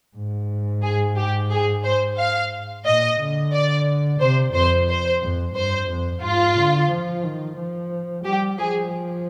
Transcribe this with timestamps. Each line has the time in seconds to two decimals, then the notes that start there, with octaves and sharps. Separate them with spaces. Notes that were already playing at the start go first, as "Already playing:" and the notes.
0.16 G#2
0.83 G#4
1.16 G4
1.50 G#4
1.84 C5
2.18 F5
2.85 A#2 D#5
3.19 D3
3.52 D5
4.20 C3 C5
4.54 F2 C5
4.88 C5
5.22 F2
5.55 G2 C5
5.89 F2
6.23 G#2 F4
6.57 D3
6.91 F3
7.23 D#3
7.57 F3
8.25 G3 G4
8.58 F3 G#4